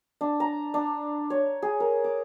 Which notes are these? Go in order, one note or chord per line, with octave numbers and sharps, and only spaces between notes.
D4
A#5
D4
C#5
G#4
A#4
D6